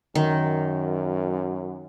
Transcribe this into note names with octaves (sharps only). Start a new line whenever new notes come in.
F#2 D#3